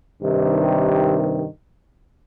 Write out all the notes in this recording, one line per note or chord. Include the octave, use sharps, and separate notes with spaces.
G2 C3 D#3